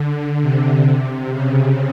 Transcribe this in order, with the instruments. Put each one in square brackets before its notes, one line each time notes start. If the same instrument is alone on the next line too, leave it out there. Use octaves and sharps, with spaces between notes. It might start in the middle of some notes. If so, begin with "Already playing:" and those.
Already playing: [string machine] D3
C3
C3
C#3